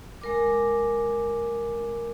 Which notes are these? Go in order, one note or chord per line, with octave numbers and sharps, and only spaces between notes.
G#3 A#4 D6